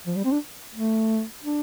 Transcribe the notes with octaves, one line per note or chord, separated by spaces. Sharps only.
F3
G3
C4
D4
A3
D4